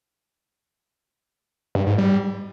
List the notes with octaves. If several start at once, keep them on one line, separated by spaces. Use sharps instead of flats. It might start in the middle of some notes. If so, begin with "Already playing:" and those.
G2
G#2
G3